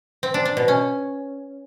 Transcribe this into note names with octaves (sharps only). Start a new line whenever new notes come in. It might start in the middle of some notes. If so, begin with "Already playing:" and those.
C4
D4
D4
B2
C#4